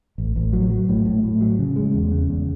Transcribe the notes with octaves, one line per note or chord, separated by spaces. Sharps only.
A1
A1
F#3
F#3
A2
A2
A2
F#3
C#3
G#3
E2
C#3
E2